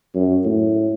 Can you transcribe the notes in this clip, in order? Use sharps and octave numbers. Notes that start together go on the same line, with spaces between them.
F#2
A2